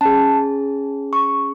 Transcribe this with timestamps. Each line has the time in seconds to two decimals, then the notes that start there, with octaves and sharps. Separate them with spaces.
0.01 C#4 G#4 A5
1.13 C#6